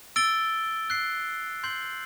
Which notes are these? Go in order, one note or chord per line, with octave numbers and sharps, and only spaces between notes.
E6 A6 D7 G7
F#6 C7 G7
C6 G6 C7 F#7